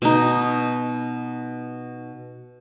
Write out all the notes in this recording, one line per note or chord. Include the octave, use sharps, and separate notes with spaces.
B2 D#4